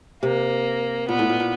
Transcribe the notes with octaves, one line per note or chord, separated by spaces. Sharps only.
C3 A#3
A#2 B3
A2
A#2
A#2